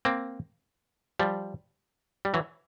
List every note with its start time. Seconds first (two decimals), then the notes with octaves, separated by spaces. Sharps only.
0.05 A#3 C4
1.19 F3 G3
2.25 G3
2.34 E3 F#3